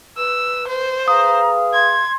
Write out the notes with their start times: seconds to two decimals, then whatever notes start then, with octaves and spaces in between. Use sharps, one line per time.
0.17 B4 E6
0.68 C5
1.08 G#4 B4 F5 A#5 D#6
1.73 C6 G#6